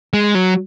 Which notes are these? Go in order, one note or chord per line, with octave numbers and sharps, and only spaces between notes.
G#3
F#3